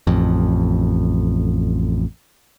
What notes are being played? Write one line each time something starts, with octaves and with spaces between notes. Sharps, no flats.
A1 F2